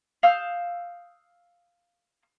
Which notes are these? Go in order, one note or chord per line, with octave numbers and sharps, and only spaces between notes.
F5 D#6 E6 G6